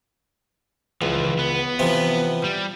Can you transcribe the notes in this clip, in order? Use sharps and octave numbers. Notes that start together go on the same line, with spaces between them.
C#2 E3 F3
B3
C3 E3 F3
G3